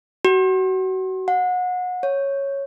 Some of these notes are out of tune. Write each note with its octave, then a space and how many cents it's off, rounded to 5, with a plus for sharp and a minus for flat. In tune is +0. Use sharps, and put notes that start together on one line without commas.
F#4 +30
F#5 -30
C#5 -5